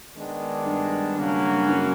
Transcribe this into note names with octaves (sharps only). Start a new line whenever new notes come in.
D#3 G#3 B3 D4
G2
C#3 F#3 A#3 C#4 F#4
F#2